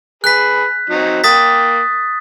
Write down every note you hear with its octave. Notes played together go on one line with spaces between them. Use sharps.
G#4 B4 F#6 B6
F#3 C4 D#4
A#3 G5 D#6 A6 B6